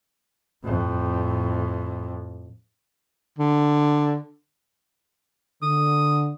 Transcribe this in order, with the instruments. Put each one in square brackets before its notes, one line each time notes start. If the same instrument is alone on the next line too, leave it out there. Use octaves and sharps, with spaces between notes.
[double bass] F2 A2
[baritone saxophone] D3
[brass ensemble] D3 [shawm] D#6